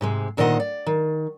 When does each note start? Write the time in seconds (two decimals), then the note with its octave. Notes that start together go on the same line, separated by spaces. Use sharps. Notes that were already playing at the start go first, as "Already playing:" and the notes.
0.01 G#2 C3 G#3
0.37 D2 A#2 D#3 C5 D#5 F#5
0.60 D5
0.86 D#3